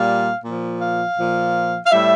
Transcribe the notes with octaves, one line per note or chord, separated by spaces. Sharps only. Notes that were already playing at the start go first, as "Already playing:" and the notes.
Already playing: A#2 G3 F5
A#2 F3
F5
A#2 F3
F5
A2 G3 E5